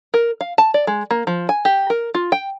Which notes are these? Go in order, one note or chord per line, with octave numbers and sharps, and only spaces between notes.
A#4
F5
A5
D5
G#3
A#3
F3
G#5
G4
A#4
F4
G5